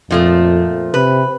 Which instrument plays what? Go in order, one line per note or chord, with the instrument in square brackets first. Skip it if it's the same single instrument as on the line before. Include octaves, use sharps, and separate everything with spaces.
[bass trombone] F2 [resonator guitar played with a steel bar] A#2 F3 A3
[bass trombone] C3 [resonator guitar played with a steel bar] B4